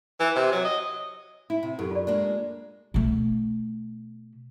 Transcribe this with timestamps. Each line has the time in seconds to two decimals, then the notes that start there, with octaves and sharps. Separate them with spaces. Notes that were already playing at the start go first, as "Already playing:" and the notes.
0.20 E3
0.36 C3
0.52 F#3
0.65 D#5
1.50 E4
1.63 C3
1.79 F#2 G4 A4
1.91 F4 D5
2.07 G#3 A#3 D4
2.94 B2 A3